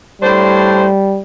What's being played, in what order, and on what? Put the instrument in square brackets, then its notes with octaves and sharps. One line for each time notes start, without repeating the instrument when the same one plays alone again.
[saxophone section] A2 D4 C5 [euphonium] G3